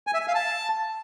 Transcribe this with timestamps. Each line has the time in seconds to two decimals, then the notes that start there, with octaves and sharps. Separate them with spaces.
0.07 G#5
0.14 E5
0.21 G#5
0.28 F5
0.35 A5